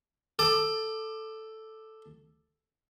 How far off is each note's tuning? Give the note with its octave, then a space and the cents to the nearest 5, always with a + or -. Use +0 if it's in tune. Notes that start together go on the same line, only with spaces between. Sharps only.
A4 +0 D6 +25